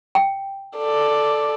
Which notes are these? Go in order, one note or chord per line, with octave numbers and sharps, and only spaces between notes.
G5
A4 D5